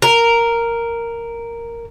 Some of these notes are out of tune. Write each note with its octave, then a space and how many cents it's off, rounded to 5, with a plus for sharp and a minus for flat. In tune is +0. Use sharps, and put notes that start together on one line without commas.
A#4 -5